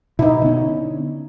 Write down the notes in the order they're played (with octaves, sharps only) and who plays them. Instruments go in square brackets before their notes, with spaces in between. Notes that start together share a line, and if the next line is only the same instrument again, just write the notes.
[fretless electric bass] B2 [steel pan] D#4 E4
[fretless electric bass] D3 B3 C#4